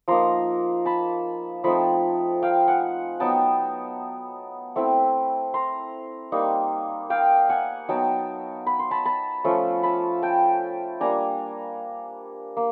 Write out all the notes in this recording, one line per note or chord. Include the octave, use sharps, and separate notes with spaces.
F3 A#3 D#4 A#5 C6
A5 B5
F3 A3 C4 D#4 A5 B5
F5 G5
F#5 G#5
F#3 B3 D#4 G5 A5
A3 C4 E4
A#5 C6
G3 A#3 D#4
F5 G5
F#5 G#5
F#3 B3 D#4 G5 A5
B5
C6
A5 B5
A5 B5
F3 A3 C#4
A5 B5
G5 A5
G3 A#3 D4 G#5 A#5
A#3